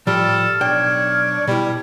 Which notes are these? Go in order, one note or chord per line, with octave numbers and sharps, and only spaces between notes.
A2 F3 G3 A4 F6
B1 D4 C#5 G5
B2 G3 E4